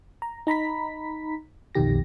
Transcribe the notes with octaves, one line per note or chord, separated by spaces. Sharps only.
A#5
D#4 A#5 B5 B6
B1 F2 B2 D#3 G4 A#6